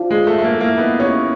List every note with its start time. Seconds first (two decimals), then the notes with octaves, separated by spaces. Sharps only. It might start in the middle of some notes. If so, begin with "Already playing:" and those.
Already playing: F3 D4
0.10 G#3 B4
0.27 A3
0.33 E5
0.38 A3
0.44 A#3
0.55 E4
0.60 A#3
0.77 B3 D#4
1.00 C#4 G4